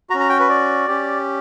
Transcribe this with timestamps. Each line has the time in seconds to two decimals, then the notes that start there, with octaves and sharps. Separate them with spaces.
0.10 F#4 A#5
0.14 C#4
0.20 A#5
0.29 G5
0.39 B4
0.49 D5
0.88 C#4 G4